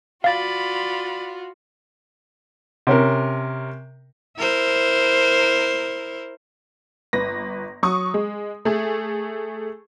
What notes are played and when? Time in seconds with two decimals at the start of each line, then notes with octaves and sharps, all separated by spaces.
0.24 F4 F#4 D5 F5 B5 A6
2.87 C3 C#4 A#4
4.37 E4 A#4 C5
7.13 G1 B4 A#6
7.83 F#3 C#6 D#6
8.14 G#3
8.65 A3 G#4